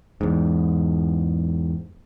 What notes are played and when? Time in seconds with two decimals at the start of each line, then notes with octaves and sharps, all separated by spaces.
0.21 E2 G#2